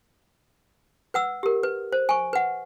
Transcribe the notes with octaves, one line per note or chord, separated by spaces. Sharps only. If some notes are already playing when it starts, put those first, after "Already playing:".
B4 F#5 E6
G4 A#4
B4
C5
G#5 C#6
B4 F#5